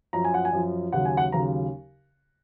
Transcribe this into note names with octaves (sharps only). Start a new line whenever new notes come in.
F#2 F3 A#5
G#5
F#5
G#5
F#2 F3
D#2 C#3 F#3 F#5
G#5
F#5
D#2 C#3 F#3 A#5